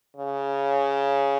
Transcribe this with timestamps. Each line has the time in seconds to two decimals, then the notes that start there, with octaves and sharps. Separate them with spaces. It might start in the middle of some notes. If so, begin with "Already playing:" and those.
0.17 C#3